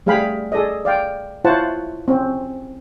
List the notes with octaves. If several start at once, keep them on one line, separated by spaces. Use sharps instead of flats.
G3 A3 G#4 F5 G5 B5
G#4 A4 D5 D#5
D5 F5 G5
E4 F4 C5 C#5 F#5 A5
C4 C#4